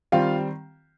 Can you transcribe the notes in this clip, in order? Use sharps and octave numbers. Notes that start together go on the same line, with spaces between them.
D#3 G3 C4 F4 F5